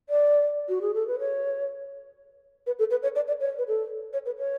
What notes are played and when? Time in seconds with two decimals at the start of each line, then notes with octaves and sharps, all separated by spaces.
0.09 D5
0.69 F#4
0.81 G#4
0.94 A4
1.07 B4
1.19 C#5
2.67 B4
2.79 A4
2.91 B4
3.03 C#5
3.15 D5
3.27 D5
3.40 C#5
3.58 B4
3.68 A4
4.13 C#5
4.26 B4
4.37 C#5